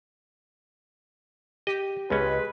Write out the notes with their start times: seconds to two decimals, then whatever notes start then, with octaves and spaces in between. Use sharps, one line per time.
1.67 G4 D#5
2.10 C#2 G#3 C#4 B4